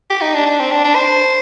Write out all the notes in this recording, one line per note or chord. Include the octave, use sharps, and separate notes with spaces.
G4
D#4
D4
D4
C4
D4
D4
C5